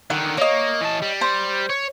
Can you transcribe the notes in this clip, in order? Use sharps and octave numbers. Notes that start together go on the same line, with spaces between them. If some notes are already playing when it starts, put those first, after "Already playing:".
D3 D#3 F#5
A#3 C#5 D#5
E3 A5
G3
C5
C#5